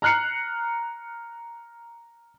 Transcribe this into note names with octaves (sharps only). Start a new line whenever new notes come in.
A#5 F6 F#6 C7 C#7